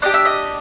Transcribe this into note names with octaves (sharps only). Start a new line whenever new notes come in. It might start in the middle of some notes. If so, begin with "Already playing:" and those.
D4 G4 D#5
E5
D#5